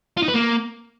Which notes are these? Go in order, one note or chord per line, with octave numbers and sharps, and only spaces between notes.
F4
D#4
B4
A#3